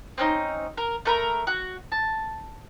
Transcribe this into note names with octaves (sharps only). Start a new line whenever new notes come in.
C4 C#4 D#4
A#4
A3 A#4 B5
F#4
A5